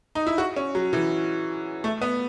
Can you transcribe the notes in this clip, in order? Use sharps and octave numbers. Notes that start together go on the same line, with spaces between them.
D#4
E4
F#4
C#4
F#3
E3
A3
B3